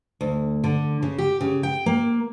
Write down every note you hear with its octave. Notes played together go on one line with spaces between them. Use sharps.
D2
D3
C#3
G4
C#3
G5
A#3